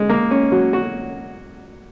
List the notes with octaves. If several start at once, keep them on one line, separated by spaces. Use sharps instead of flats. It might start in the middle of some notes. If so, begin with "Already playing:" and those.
Already playing: G#3
A#3
C#4
F#3
F#4